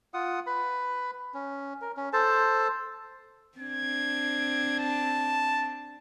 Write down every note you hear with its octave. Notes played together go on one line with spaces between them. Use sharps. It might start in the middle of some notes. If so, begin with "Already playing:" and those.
F4 F#5 D#6
B4 B5
C#4
A#4
C#4
A4 C5 A5
C4 D4 G#6
A5